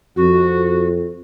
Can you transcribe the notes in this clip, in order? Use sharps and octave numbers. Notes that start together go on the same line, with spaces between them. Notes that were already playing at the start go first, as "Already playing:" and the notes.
F2 F#4